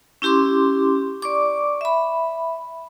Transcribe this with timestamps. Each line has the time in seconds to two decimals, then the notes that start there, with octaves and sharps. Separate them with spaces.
0.22 C#4 E4 G4 C6 D6
1.22 D5 C#6 D6
1.81 E5 B5